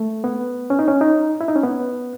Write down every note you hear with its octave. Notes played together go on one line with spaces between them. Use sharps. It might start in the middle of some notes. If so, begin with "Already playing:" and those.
Already playing: A3
B3
C#4
D#4
C#4
D#4
E4
D#4
C#4
B3